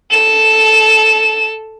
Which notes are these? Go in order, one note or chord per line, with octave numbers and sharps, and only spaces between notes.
A4 E7